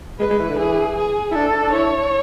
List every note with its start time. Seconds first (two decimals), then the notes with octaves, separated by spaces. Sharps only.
0.20 G#3 B4
0.30 G#3
0.39 E3
0.49 D3
0.59 E3 G#4
0.97 G#4
1.31 E4
1.34 D4 A4
1.63 D4
1.73 E4 C#5